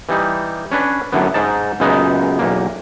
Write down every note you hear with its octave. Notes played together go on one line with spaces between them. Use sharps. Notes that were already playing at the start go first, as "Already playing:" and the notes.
E3 G3 D#4
C#4 D4 B4
F#2 A2 D3 B3
G#2 D#4 A5
C#2 F#2 A#2 G#3 B3 D#4
B1 E2 A#3